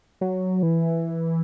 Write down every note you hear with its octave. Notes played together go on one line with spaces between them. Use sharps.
F#3
E3